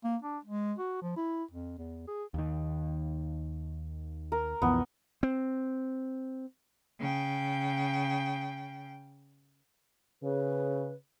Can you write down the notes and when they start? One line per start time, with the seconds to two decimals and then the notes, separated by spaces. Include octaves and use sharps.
0.04 A#3
0.22 D4
0.45 G#3
0.79 F#4
1.02 F3
1.17 E4
1.51 F2
1.78 E2
2.07 G#4
2.34 D#2 D#3
4.32 A#4
4.62 B1 F2 E3 B3
5.23 C4
7.00 C#3 G5
10.22 C#3 B4